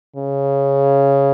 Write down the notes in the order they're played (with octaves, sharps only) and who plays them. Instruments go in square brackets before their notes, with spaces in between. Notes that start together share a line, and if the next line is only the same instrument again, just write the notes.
[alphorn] C#3